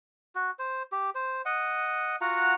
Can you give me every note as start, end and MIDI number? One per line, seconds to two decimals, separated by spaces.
0.35 0.51 66
0.59 0.83 72
0.92 1.10 67
1.15 1.42 72
1.45 2.16 75
1.45 2.16 78
2.21 2.55 65
2.21 2.55 66
2.21 2.55 78
2.21 2.55 82